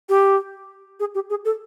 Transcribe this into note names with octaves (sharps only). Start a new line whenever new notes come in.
G4
G#4
G4
G#4
A4